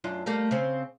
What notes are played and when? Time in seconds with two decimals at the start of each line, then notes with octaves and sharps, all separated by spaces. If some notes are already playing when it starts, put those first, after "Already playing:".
0.04 F#2 D4 F4
0.26 G3 A3 A#3
0.51 C#3 C4